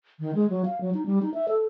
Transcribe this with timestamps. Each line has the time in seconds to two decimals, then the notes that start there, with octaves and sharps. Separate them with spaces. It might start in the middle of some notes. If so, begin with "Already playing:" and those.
0.20 D#3
0.35 G#3
0.50 F#3
0.65 F5
0.81 F#3
0.94 D#4
1.06 G3
1.22 D#4
1.34 E5
1.48 A4